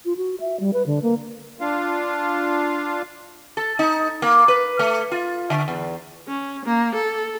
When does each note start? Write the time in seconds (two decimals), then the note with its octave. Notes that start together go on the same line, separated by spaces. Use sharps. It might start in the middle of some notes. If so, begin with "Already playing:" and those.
0.05 F4
0.17 F#4
0.40 E5
0.60 G3
0.74 B4
0.86 D3
1.03 A#3
1.60 D4 F4 F5
3.57 A4
3.79 D#4
4.22 A#3
4.48 B4
4.79 A3
5.12 F4
5.50 D3
5.68 E2
6.28 C#4
6.65 A#3
6.95 A4